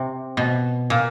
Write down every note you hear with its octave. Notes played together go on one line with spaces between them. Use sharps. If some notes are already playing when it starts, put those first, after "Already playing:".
Already playing: C3
B2
A#2